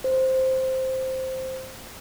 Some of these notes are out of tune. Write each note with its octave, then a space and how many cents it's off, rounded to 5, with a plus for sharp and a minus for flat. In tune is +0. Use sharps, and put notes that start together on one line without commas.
C5 +0